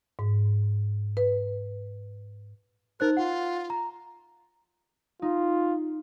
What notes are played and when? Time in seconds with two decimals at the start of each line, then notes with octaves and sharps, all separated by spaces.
0.19 G#2
1.17 B4
3.00 D#4 A#4 C5 F#6
3.17 F4 F#5
3.70 A#5
5.22 D#4 F4